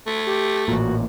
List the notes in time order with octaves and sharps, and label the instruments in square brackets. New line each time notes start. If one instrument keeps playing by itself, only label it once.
[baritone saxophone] A3
[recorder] G4
[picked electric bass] A1 A#2 [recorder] F#4